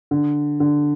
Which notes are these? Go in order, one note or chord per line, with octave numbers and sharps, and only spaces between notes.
D3
D3